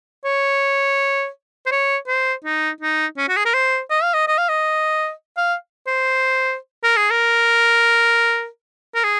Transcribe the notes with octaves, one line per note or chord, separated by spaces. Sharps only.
C#5
C5
C#5
C5
D#4
D#4
C#4
F#4
G#4
A#4
C5
D#5
F5
D#5
D#5
F5
D#5
F5
C5
A#4
G#4
A#4
A#4
G#4